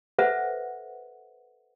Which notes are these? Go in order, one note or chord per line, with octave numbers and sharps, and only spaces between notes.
A4 B4 C5 E5 F#5